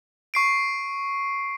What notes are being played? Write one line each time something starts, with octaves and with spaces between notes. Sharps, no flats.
C#6 C7 D7